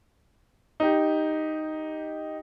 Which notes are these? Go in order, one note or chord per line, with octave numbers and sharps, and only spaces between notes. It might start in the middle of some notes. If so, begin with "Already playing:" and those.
D#4 G4